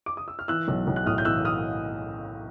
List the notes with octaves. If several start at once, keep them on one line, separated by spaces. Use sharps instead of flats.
D6
D#6
E6
F6
E3 E6 F#6
B1
B1
F#6
A2 D#6 F6
G6
E3 E6 F#6
D#6 F6